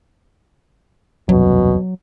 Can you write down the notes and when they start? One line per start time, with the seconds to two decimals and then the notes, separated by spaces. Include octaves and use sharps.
1.29 E1 C2 F#2 B2 F#3